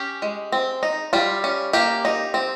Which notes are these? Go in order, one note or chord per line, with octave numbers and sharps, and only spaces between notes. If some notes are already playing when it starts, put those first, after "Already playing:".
Already playing: C#4 G4
G#3
C4
D#4
G3 F4
C#4
A#3 G4
D#4
C4